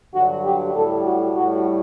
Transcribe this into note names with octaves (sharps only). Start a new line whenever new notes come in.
G2 D3 F#3 F#4
G4
A2 G3 A4
F#4
A2 G3 F#4